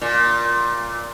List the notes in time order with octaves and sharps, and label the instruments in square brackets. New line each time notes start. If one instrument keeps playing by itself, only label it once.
[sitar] A#2